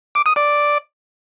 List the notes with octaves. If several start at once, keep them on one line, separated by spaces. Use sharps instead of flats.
D6
D#6
D5